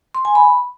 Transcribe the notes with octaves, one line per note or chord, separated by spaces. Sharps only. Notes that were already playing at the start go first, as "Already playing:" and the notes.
C6
G#5
B5